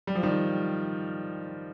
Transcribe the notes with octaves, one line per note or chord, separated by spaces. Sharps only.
G3
F3
D#3 G3